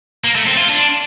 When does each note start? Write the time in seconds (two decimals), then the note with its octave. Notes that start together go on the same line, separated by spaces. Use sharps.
0.24 A#3
0.35 A3
0.46 C4
0.57 F4
0.68 D4